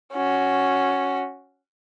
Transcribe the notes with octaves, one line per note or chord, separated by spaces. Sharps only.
C#4 F#4